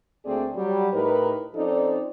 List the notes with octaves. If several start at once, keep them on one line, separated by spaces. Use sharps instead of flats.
D2 A3 A#3 C4 G#4 D5
F#3 G3
A2 D#4 G4 A#4 B4
F3 C4 C#4 D#4 A4 D5